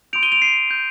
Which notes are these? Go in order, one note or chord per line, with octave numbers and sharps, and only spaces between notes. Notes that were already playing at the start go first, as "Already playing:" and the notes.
C6 D#6 G6 D7 F7
D#7 G7
D7 F7
C7 D#7
G6